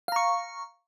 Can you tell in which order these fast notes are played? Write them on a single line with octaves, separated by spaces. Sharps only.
F5 A#5 C#6